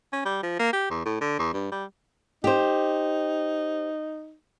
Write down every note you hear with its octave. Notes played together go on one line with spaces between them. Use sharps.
C#4
G3
F3
A#3
G4
E2
A2
D3
E2
G2
G3
D#4 G4 C5